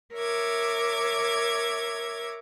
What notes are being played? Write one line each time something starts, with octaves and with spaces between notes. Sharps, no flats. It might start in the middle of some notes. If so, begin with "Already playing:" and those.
A#4 C#5 E5 D6 G#6